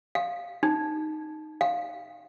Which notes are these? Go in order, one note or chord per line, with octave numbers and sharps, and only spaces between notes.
F5
D#4
F5